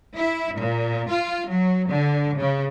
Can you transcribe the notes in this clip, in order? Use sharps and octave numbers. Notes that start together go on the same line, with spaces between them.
E4
A#2
F4
F#3
D3
C#3